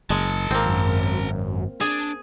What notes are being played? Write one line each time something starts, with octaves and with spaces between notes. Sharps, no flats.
F#1 G#3 A#4 A5
G#1 A#3 C4
F#2
D4 G#4